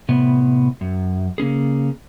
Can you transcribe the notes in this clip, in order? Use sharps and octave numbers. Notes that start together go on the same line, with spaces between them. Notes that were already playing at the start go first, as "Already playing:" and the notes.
A2 C3 B3
F#2
C#3 A#3 C#4 G#4